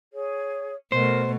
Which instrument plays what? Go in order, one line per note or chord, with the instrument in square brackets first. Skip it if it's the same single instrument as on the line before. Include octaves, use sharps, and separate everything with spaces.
[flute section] G#4 C#5
[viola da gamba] B2 A3 [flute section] A#4 D5 D#5 [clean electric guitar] C5